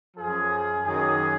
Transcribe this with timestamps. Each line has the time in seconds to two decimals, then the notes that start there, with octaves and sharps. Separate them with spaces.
0.15 F#2 F3 G#4
0.84 F#2 D#3 F#3 G#4